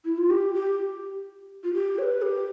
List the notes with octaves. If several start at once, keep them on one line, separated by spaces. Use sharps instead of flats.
E4
F4
G4
G4
F4
G4
C#5
B4
G4